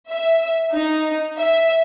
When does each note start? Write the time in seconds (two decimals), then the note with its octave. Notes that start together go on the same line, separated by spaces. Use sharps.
0.11 E5
0.73 D#4
1.40 E5